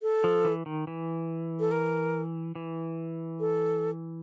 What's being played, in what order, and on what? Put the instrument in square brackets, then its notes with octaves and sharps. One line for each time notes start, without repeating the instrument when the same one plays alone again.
[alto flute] A4
[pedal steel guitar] F3
E3
D#3
E3
[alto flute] A4
A#4
[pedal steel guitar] E3
[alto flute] A4